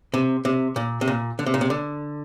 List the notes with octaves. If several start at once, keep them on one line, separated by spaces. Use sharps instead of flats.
C3
C3
A#2
C3
A#2
D3
C3
A#2
C3
D3